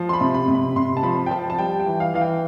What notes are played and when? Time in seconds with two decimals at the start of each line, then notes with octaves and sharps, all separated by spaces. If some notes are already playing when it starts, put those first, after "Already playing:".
Already playing: F3
0.09 C6
0.13 B5
0.21 C3
0.34 B5
0.48 C3
0.55 B5
0.76 C3 C6
0.97 A5
1.03 F3 B5
1.26 G5
1.31 F3 A5
1.50 A5
1.58 G3 G5
1.80 G5
1.86 E3
2.00 F5
2.14 E3 F5
2.21 G5